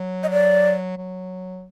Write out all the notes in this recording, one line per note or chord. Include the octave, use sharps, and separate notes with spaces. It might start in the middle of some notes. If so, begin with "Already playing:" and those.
Already playing: F#3
D#5
D5
F#3